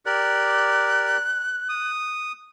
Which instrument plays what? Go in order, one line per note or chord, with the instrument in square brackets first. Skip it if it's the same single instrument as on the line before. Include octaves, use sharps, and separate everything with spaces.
[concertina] G4 A#4 D5 [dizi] F#6
[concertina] D#6